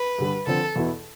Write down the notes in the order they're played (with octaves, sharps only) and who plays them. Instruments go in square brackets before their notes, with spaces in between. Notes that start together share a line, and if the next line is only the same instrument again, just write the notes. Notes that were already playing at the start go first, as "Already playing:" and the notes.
Already playing: [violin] B4
[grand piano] G2 D3 G3
[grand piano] D3 F3 C4 [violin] A4
[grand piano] E2 B2 B3 E4